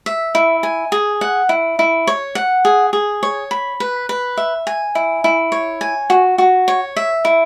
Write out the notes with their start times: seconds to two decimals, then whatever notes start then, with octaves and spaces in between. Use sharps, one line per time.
0.06 E5
0.35 E4
0.63 G#5
0.92 G#4
1.21 F#5
1.49 E4
1.79 E4
2.07 C#5
2.35 F#5
2.65 G#4
2.93 G#4
3.23 C#5
3.51 B5
3.80 B4
4.09 B4
4.37 E5
4.67 G#5
4.95 E4
5.24 E4
5.52 C#5
5.81 G#5
6.10 F#4
6.38 F#4
6.68 C#5
6.96 E5
7.25 E4